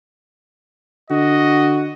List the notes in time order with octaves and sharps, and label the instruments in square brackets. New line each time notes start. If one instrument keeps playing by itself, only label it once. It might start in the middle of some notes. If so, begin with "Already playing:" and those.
[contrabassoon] D3 [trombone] F#4 [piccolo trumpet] D#5